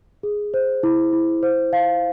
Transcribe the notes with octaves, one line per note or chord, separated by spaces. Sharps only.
G#4
C5
E4
E4
C5
F5